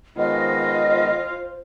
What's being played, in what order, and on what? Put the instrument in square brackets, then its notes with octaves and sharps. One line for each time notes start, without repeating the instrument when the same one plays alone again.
[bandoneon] D#3 G#3 B3 [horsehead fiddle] F4 [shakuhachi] C5 [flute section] D#5